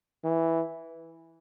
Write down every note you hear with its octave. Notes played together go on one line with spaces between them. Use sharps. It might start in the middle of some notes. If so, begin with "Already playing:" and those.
E3